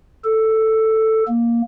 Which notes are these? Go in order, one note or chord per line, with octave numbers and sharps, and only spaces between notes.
A4
A#3